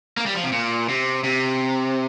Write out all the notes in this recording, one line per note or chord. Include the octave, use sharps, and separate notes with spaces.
A#3
G3
F3
C3
A#2
C3
C3